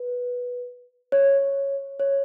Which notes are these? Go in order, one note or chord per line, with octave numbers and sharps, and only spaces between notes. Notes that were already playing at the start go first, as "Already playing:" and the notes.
Already playing: B4
C#5
C#5